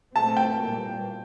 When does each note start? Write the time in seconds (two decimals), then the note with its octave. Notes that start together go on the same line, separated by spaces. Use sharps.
0.15 A#2 A3 C4 A5
0.37 G5
0.59 A#2 G3 A#3